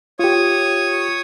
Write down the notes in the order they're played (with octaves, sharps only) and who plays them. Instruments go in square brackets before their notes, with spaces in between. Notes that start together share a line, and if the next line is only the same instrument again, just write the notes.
[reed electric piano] F4 G4 [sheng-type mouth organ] C#5 C#6 D#6